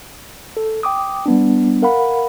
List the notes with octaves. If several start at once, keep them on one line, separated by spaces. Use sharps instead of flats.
A4
G5 D6 D#6
G3 B3 D4
A#4 F5 F#5 B5